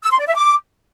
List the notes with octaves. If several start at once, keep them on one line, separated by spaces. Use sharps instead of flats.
E6
C6
D5
E5
D6